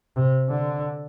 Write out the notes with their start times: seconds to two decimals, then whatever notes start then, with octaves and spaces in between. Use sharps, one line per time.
0.16 C3
0.49 D3